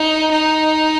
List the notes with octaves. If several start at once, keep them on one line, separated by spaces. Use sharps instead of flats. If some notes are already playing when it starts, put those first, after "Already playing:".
Already playing: D#4
D#4